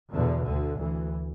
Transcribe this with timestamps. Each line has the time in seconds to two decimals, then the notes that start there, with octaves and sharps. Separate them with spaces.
0.10 E2 B2 D3
0.44 D2 D3
0.78 D2 E3